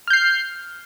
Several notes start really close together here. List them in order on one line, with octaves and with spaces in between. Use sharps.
F6 G6 C7